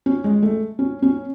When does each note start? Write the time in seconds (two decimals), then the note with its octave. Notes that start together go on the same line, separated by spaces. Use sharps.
0.06 C#4
0.24 G#3
0.43 A3
0.79 C#4
1.02 C#4